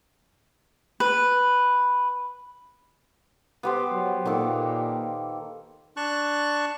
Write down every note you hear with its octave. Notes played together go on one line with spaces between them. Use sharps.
B4
B3 G4 C5
F#3
A#2 D#3 A#3 A4
D4 A5 C#6 F#6